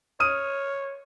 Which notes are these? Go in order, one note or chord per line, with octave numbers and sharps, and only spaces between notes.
C#5 D#6 F6 D#7